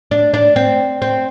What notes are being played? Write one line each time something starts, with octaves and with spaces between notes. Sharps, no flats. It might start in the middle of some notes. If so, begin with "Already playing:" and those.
D4
D4
C4
C4